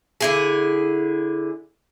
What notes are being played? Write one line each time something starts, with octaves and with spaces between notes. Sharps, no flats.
D3 E4 G#4